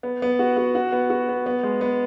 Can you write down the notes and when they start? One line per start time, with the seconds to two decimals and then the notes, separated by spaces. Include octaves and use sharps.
0.03 B3
0.22 B3
0.39 F#4
0.57 F#4
0.75 F#4
0.92 B3
1.10 F#4
1.29 B3
1.46 B3
1.63 G#3
1.81 B3